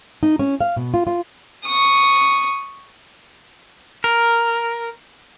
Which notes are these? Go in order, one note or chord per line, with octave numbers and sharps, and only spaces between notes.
D#4
C#4
F5
B2
F4
F4
C#6 D#6
A#4